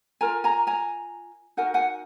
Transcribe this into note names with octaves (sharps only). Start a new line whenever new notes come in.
F4 A#4 G#5 A#5
G#5 A#5
G#5 A#5
D#4 F#4 A#4 F#5 G#5
F#5 G#5